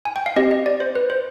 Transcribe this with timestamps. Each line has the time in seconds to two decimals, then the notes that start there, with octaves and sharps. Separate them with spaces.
0.05 G#5
0.16 G5
0.26 F5
0.36 C4 G4 D#5
0.51 D#5
0.66 D5
0.80 C5
0.95 B4
1.10 C5